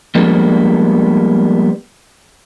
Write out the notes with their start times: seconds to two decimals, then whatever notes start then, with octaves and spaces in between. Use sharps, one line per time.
0.15 F3 G3 G#3 A#3 B3 D4